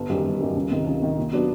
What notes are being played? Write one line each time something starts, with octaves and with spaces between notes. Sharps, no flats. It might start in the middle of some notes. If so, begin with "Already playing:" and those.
Already playing: G1
F#2 D#3 G3
G1
F#2 D#3 G3
C#2
C3 D#3
C#2
C3 D#3
A#2
F#3 B3 D4 F#4